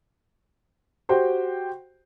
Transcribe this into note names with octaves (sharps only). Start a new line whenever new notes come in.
F#4 G4 C5 G5